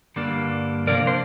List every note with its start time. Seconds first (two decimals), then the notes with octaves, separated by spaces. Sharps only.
0.16 G2 D3 G3 A#3 D4
0.87 C3 F3 A#3 D4 A#4 D5
1.07 C5